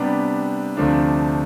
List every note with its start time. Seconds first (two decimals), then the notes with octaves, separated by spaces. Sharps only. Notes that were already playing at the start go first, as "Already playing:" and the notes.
Already playing: C3 G3 B3 D4
0.77 D2 C3 F3 A3 D4